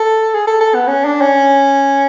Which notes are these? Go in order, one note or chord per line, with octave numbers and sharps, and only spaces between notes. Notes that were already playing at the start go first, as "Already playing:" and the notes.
Already playing: A4
G#4
A4
A4
B3
C#4
D4
C#4